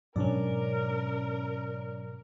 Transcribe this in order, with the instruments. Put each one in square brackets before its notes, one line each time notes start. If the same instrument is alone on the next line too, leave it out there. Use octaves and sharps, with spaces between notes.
[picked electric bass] G#2 B2 D4 [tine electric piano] F#3 [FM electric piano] C#4 D5 [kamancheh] A#4